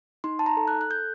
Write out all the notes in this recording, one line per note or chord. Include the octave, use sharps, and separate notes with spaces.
D#4 C6
A5
A#5
A4
F#6
F#6
A4 G6